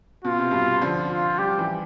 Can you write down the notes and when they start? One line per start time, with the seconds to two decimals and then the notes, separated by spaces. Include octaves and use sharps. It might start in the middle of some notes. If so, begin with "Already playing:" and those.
0.24 B2 F4
0.38 C3
0.51 G2 B2
0.82 D3 F3
1.10 F4
1.39 G3 G4
1.49 F3
1.59 E3 G3